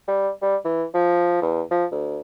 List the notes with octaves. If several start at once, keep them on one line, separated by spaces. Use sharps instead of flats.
G3
G3
E3
F3
E2
F3
D2